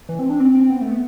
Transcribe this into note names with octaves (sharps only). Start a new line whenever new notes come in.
E3
C4
D4
C4
C4
B3
A3
B3